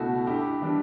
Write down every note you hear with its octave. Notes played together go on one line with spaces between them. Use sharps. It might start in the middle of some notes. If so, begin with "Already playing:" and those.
Already playing: C#2 B2 A3 E4 F#4
G2 E4 G4
E3 G3 D4